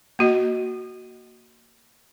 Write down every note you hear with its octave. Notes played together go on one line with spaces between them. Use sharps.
A#3 F#4 D#5